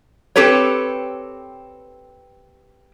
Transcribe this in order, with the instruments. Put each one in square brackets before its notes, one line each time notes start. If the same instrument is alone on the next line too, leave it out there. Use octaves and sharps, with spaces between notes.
[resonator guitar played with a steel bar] C4 G4 A4 B4 C#5